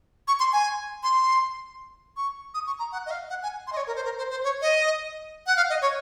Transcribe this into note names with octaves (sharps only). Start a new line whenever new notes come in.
C#6
C6
G#5
C6
C#6
D#6
C#6
A#5
F#5
D#5
F5
F#5
G#5
C6
D#5
C#5
A#4
C5
A#4
C5
C5
C#5
D#5
F#5
F5
D#5
C#5